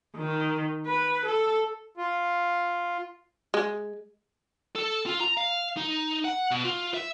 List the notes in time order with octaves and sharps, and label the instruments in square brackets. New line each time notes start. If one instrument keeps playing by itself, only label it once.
[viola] D#3
B4
A4
[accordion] F4
[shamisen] G#3
[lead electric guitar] A4
F4
A#5
F5
D#4
F#5
B2
F4
E5